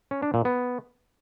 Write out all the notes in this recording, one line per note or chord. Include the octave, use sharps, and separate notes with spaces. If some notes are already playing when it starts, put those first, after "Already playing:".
C#4
D4
A#2
B3